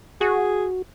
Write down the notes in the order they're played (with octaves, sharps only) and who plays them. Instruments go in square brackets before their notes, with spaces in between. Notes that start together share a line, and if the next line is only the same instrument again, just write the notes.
[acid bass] F#4 [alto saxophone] G#4